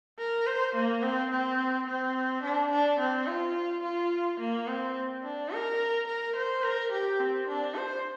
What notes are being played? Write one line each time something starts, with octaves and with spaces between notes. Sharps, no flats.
A#4
C5
A#3
C4
C4
C4
D4
D4
C4
F4
F4
A#3
C4
D4
A#4
A#4
C5
A#4
G4
C4
D4
C5